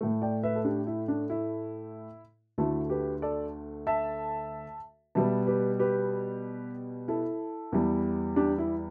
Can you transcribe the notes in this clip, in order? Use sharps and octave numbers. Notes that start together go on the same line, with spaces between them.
A2 A3
D5 G5
B4 E5
A4
D4 G4
E4
D4
E4
D2 D3 A3 E4 A4
G4 B4
A4 D5
E5 A5
B2 G3 B3 E5 A5
G4 B4
G4 B4
E4 A4
E2 E3 G3
D4 G4
E4